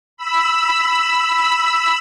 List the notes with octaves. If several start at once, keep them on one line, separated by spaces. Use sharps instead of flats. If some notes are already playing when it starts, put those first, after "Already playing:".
B5 E6